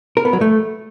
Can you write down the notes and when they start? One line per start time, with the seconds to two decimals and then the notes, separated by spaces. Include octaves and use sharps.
0.17 A#4
0.25 B3
0.33 F#3
0.41 A3